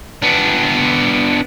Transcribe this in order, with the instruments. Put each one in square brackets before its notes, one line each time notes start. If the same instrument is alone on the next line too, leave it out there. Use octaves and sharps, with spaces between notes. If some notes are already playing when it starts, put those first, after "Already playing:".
[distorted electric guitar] B3 D4